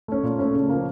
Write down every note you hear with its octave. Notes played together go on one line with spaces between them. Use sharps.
A3 C#4
A#2
A3 C#4
C#3
F3 A#3